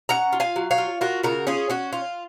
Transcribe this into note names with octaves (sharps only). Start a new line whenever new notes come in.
C#4 F#5 A#5
F4
F5 G#5
F#3
C#5 F5
F4
F4 F#4 A#4
C#3 F#4 A#4
C#4 F4 G#4
C#4 F#4
F4